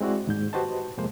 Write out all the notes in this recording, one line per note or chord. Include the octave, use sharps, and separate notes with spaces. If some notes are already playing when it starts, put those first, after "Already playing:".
G#3 C4 E4 F#4 D5
D#2 G#2 G6
F#4 G4 B4 C5 D#5 A5
F2 C3 G#3 A#3 C5